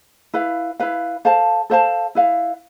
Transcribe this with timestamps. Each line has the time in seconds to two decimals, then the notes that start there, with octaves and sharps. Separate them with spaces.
0.34 E4 B4 F5
0.80 E4 B4 F5
1.25 A4 C5 F5 A5
1.70 A4 C5 F5 A5
2.15 E4 B4 F5